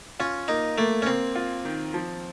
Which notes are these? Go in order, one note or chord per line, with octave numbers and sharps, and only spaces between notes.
C#4 F4
A#3 D#4
A3 A#3
C#4
A#3 C4
F4
D#3
F3